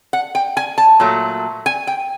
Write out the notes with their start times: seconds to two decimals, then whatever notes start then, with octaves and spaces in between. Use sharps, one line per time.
0.13 F#5
0.35 G5
0.57 G#5
0.78 A5
1.00 A#2 F#3 A3
1.66 G#5
1.87 G5